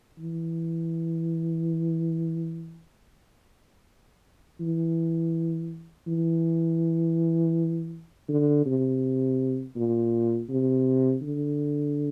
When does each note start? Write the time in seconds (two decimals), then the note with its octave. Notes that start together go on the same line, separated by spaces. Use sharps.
0.19 E3
4.60 E3
6.07 E3
8.29 D3
8.66 C3
9.76 A#2
10.50 C3
11.22 D3